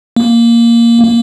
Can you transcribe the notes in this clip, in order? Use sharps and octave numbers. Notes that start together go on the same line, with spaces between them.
A#3
A#3